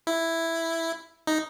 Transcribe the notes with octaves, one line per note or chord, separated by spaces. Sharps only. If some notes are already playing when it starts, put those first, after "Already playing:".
E4
D#4